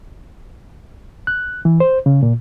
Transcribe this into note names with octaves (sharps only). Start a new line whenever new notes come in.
F#6
E3
C5
C#3
A#2